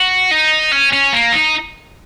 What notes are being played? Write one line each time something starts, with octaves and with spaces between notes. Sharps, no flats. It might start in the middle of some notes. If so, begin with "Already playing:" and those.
Already playing: F#4
D#4
C#4
C#4
A#3
D#4